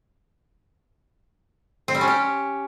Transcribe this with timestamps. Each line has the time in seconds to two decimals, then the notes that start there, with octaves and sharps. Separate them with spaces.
1.88 C4
1.95 G3
2.01 C#4
2.07 G4